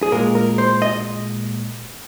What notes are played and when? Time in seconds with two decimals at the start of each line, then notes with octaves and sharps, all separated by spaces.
0.03 G#4
0.12 A#2 G#3 A#4
0.35 A#4
0.58 C5
0.82 D#5